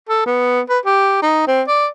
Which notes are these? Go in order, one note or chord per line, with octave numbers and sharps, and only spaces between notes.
A4
B3
B4
G4
D#4
C4
D5